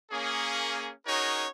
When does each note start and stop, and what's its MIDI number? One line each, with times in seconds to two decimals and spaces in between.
0.11 0.91 58
0.11 0.91 61
0.11 0.91 68
1.06 1.46 61
1.06 1.46 63
1.06 1.46 66
1.06 1.46 68
1.06 1.46 70
1.06 1.46 73